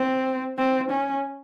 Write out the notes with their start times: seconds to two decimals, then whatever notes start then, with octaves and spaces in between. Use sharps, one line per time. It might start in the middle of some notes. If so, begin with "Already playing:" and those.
Already playing: C4
0.58 C4
0.91 C#4